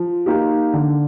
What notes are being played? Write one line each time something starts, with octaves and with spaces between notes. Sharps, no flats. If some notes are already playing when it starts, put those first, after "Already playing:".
Already playing: F3
A#3 D#4 G4
D3